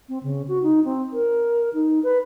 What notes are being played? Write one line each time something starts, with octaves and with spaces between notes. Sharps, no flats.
C4
C#3
F#4
D#4
C4
A#4
D#4
B4